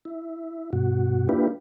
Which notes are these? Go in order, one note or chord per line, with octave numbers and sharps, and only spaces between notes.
E4
G2 B2 F#4
A#3 D4 E4 F4 G4 B4